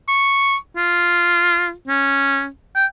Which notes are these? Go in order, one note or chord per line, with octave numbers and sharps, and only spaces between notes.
C#6
F4
C#4
G5